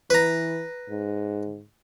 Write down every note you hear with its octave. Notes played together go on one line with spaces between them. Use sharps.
E3 B4 A#5
G#2